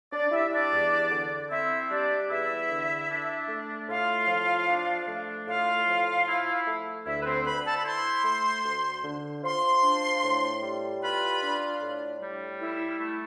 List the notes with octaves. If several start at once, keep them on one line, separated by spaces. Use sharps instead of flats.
D4 D5
G3 E4 E5
D4 D5
E2
D3
C4 E4 E5
G3 D4 D5
E2 E4 E5
D3
D4
A3
A2 F4 F5
F3
D4
A3
A2 F4 F5
F3
E4
A3
D2 E4 E5
B4
C4 C5
D3 B4 B5
A4 A5
B5
E4 C5 C6
A3
D2
D3
F4 C5 C6
D4
A2
G3
F4 B4 B5
D4
A2
G3
E4
A3